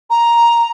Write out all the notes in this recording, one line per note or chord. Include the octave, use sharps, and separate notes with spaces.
A#5